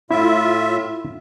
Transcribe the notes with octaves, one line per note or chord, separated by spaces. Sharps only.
A2 E4 F4 E5